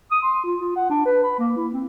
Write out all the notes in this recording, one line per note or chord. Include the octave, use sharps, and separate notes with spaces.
D#6
C6
F4
F4
F#5
D4
B4
B5
A#3
E4
C4